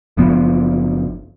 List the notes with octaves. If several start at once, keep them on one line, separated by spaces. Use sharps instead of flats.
F#1 F3 B3